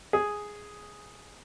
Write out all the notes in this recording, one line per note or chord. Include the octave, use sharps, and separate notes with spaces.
G#4